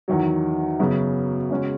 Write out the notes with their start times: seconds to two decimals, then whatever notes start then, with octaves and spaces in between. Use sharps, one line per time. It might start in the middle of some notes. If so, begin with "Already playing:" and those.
0.08 E2 D#3 F#3
0.79 F#2 C#3 F#3 B3
1.51 C#3 G#3 C#4 F#4